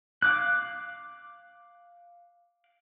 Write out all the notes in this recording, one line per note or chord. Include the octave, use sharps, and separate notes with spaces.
F5 D6 F#6